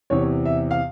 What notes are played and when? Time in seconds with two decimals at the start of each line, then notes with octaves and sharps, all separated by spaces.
0.10 E2 C3 E3 C#5
0.45 E5
0.71 F5